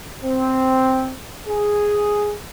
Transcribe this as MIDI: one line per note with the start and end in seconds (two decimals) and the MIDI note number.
0.23 1.12 60
1.48 2.34 68